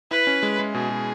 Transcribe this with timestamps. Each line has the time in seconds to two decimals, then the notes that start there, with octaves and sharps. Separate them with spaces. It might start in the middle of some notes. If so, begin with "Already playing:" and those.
0.11 E4 B4
0.27 C#4
0.43 G#3
0.59 G#3
0.74 B2 G#4
0.90 B2